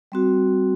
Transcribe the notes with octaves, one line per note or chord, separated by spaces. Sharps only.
G3 C4 F#4